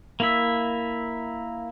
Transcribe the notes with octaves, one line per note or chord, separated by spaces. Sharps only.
A#3 E4 E5